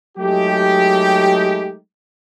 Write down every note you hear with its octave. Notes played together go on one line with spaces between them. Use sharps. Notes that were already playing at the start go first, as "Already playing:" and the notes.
F#3 G#3 A3 D#4 G4